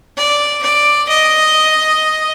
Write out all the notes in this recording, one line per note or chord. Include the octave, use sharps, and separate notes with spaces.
D5
D5
D#5